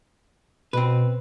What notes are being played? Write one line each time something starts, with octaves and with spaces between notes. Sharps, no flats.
B2 C4 B4